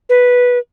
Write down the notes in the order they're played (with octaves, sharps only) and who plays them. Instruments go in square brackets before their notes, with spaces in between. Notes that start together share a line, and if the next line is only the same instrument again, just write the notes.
[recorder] B4